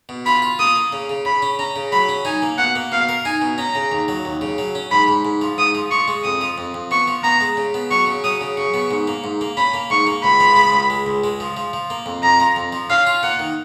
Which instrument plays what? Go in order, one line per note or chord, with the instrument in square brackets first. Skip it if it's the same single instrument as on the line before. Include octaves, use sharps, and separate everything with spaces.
[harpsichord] B2
[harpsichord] F4 [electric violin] B5
[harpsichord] F4
[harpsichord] A#3 [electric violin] D#6
[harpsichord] A#3
C#3
C#3
[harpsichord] C#3 [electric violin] B5
[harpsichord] C#4
[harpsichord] C#4 [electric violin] A#5
[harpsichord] C#3
[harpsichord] F#3 [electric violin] B5
[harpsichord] C#4
[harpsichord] D#4 [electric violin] G#5
[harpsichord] A#3
[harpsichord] B2 [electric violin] F#5
[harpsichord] A#3
[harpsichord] B2 [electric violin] F5
[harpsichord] A#4
[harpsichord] D#4 [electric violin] G#5
[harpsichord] B2
[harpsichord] C#4 [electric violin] A#5
[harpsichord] C#3
D#2
F#3
D#2
C#3
F#3
C#4
[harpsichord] G#2 [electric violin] B5
[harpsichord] G#2
G#2
F3
[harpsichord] G#2 [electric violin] D#6
[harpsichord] F3
[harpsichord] F3 [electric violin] C#6
[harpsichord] G#3
[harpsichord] F2 [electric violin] D#6
[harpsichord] F3
F2
F2
[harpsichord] B3 [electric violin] C#6
[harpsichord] F3
[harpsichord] B3 [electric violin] A#5
[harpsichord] G#3
C#3
B3
[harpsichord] F#3 [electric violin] C#6
[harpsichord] C#3
[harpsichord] F#3 [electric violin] D#6
[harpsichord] C#3
[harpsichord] C#3 [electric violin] C#6
[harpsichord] B3
G#2
A#3
G#2
A#3
[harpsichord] C#4 [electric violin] B5
[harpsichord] A#3
[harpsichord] G#2 [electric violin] C#6
[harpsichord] A#3
[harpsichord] C#2 [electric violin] B5
[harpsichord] F3
G#3
C#2
G#3
C#2
G#3
F3
F3
F3
A#3
F2
[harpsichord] F2 [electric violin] A#5
[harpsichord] F3
F2
F3
[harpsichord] C#4 [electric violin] F5
[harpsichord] F4
[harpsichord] A#3 [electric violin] F#5
[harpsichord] D#3